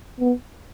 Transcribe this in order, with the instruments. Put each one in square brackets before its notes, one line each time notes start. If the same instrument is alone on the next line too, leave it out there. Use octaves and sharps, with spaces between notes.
[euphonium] B3